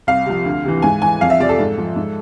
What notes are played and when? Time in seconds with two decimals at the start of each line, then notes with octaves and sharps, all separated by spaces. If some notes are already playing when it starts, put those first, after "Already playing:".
0.07 C2 F5
0.26 C3 F3
0.45 D2
0.64 C3 E3
0.82 G#2 G#5
1.02 E3 G#5
1.20 F2 F5
1.30 E5
1.40 C3 F3 D5
1.49 A4
1.59 G#2
1.78 F3
1.96 G#2